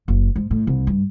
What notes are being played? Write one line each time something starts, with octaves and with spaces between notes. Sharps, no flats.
F#1
G#2
A2
C2
G2